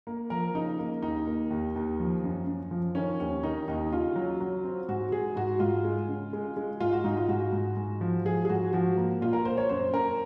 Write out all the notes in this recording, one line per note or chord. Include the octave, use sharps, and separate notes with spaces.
A#3
F3 A#4
C#3 D#4
A#3
D#2 D#4
A#3
D#2
D#2
F3
F#2
F#2
F3
D#3 C#4
D#2 C#4
D#3 D#4
D#2 D#4
C#3 F4
F#3
F#3
C4
G#2 F#4
G#2 G#4
G#2 F#4
G#2 F4
G#3
C#3
G#3
G#3
G#2 F4
F#4
G#2 D#4
F4
G#2 F#4
G#2
G#2
F3
F3 G#4
G#4
G#2 F#4
F3 F#4
A#3
A#2 F4
A#4
A#3 C5
C#5
F#2 C5
F#2 A#4